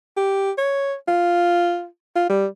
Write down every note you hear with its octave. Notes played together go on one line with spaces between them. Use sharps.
G4
C#5
F4
F4
G3